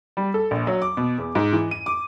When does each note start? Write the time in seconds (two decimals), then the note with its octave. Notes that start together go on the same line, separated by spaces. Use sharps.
0.17 G3
0.34 A4
0.51 A#1
0.67 F#3
0.82 D6
0.97 B2
1.18 E2
1.35 G#2
1.53 E3
1.71 D#7
1.86 D6